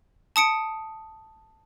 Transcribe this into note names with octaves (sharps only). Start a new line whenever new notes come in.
A5 D#6 C#7 D7